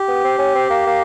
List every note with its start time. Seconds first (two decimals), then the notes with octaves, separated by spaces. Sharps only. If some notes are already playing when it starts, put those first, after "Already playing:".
Already playing: G4
0.08 B3
0.24 C4
0.39 C#4
0.55 C4
0.70 A#3
0.86 A#3